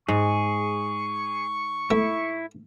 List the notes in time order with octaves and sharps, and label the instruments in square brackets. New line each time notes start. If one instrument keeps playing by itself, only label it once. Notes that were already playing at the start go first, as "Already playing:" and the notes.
[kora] G#2 [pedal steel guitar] G#4 [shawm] C#6
[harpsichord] A3 [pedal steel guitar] E4